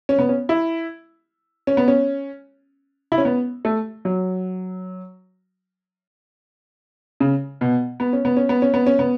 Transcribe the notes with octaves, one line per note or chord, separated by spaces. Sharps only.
C#4
B3
C#4
E4
C#4
B3
C#4
E4
C#4
B3
A3
F#3
C#3
B2
B3
C#4
B3
C#4
B3
C#4
B3
C#4
B3